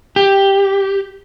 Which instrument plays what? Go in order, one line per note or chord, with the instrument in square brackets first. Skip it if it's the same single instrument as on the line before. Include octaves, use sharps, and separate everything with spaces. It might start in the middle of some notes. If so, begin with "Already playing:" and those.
[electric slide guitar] G4